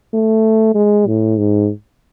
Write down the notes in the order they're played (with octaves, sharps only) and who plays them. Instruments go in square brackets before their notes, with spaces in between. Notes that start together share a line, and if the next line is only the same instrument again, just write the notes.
[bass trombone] A3
G#3
A2
G#2